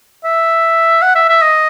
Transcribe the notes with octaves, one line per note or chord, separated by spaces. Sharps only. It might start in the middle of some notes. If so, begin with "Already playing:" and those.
E5
F#5
E5
E5
D#5